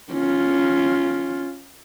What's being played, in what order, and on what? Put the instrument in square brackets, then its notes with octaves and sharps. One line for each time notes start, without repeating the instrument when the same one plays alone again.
[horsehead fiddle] C#4 F4